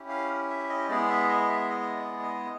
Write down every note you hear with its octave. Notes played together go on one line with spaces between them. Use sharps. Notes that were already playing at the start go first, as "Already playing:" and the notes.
Already playing: C#4 E4 G4
F5
E5
D#5
G#3 B3 E4 G#4 D5
E5
D#5
E5
D#5
D5
D5
D#5